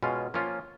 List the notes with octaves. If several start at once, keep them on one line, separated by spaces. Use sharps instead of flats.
B2 G#3 C#4 F4
F3 A#3 C#4 F4